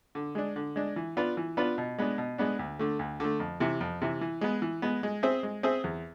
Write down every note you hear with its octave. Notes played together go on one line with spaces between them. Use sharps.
D3
G#3 D4
D3
G#3 D4
E3
B3 D4 F4 B4
E3
B3 D4 F4 B4
B2
G#3 B3 D4
B2
G#3 B3 D4
D2
D3 A3
D2
D3 A3
F2
C3 E3
F2
C3 E3
E3
G#3 B3
E3
G#3 B3
G#3
C4 G#4 C5 E5
G#3
C4 G#4 C5 E5
E2